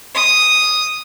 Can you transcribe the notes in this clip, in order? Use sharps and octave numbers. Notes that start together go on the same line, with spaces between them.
D#6